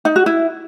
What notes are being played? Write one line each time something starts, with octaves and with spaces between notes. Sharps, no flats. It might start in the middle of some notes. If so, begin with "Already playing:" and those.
D#4
F#4
E4